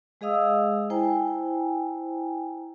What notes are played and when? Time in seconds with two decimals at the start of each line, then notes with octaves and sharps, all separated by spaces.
0.21 G#3 G#4 D#5 F5 D#6 E6
0.90 E4 C5 G5 G#5 A#5